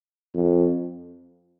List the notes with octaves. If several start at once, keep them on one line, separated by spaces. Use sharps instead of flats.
F2